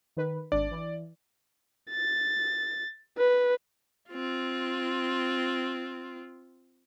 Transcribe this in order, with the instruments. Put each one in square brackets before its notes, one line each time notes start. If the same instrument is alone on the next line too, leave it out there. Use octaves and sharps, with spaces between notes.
[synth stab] D#3 B4
[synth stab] G#1 D4 [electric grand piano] D5
[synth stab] E3
[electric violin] A6
B4
[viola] C4 F4